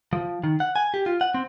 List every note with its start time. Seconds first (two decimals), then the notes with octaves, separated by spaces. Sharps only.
0.13 F3
0.44 D#3
0.60 F#5
0.76 G#5
0.94 G4
1.06 F4
1.21 F#5
1.34 C4